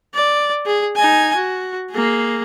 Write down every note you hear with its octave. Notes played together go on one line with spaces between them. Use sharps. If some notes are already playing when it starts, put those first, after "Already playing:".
D5
G#4
D#4 G#5
F#4
A#3 G#4